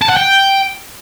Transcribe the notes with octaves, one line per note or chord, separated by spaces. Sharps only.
A5
F#5
G5